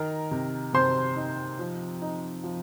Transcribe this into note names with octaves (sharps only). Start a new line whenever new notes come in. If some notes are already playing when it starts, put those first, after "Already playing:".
Already playing: D#3 A#4 A#5
C3
C3 C5 C6
D#4
F3
D#4
F3